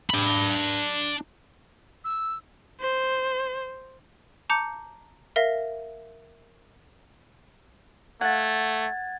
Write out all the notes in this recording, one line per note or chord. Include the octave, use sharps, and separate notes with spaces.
D4 B5
E6
C5
A5 A#5 D6 G6 C#7
A#4 E5 F5 A#6
A3 F#5 G#6 A6